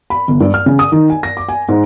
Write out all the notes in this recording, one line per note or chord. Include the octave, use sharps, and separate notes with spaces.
B5
G1
G2
F6
C#3
D#6
D#3
G#5
A#6
D6
G#5
G#2